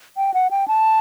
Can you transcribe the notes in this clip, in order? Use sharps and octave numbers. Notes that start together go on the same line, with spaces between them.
G5
F#5
G5
A5